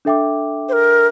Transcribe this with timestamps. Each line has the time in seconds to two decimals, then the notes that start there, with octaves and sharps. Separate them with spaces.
0.05 D4 A4 E5 G5 D6
0.69 C5
0.73 A#4